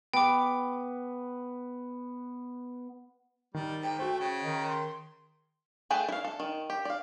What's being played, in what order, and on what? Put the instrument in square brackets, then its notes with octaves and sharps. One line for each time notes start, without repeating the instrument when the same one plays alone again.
[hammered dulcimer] B3 [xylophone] G5 D6
[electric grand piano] D#3 [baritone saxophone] G3
[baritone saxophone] G#2 [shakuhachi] G5
[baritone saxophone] A3 [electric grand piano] F#4 C5
[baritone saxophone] C#3 [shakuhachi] G5
[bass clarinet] D#3 [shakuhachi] D#5
[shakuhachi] C6
[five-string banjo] A3 G#4 B4 G5 A5
E4 F5
A4
D#3
G4
D5 F5